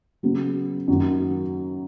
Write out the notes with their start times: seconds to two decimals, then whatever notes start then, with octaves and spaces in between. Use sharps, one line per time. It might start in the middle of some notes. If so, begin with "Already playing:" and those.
0.23 C#3 F#3 B3
0.88 F#2 D#3 F#3